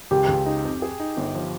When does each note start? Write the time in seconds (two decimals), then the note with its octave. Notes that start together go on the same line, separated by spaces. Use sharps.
0.11 C#2 G4
0.29 C#2
0.46 D#4
0.64 F2
0.82 G#4
1.00 D#4
1.17 G1
1.35 F3